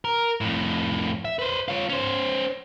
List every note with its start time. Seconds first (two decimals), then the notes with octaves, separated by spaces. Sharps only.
0.05 A#4
0.41 F2 A2
1.25 E5
1.39 B4 C5
1.68 F4 C#5
1.89 C#4 C5